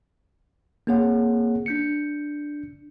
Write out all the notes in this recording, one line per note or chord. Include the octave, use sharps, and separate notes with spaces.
A#3 C4 G#4 C#5 F#5
D4 G6 C#7